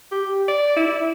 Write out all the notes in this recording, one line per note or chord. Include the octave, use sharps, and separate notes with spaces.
G4
D5
E4